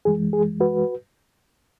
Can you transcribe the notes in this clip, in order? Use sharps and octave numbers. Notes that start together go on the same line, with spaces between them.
F#2 E3 G#3 G#4
G#4
F#4 B4